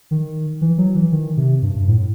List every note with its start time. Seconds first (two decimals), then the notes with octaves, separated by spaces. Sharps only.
0.11 D#3
0.61 E3
0.78 F#3
0.95 E3
1.12 D#3
1.37 C3
1.62 G2
1.75 G2
1.88 A2